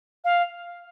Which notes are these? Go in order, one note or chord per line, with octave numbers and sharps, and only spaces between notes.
F5